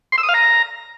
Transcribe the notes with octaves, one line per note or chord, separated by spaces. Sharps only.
C6
E6
D#6
F5
A#5